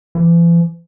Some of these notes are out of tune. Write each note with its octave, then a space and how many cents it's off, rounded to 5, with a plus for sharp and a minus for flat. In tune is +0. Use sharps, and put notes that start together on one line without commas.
E3 +45